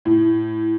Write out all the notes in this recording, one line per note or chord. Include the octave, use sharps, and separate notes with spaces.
A2